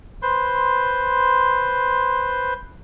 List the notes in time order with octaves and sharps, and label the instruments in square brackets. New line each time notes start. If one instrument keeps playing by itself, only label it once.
[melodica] B4 C5 C6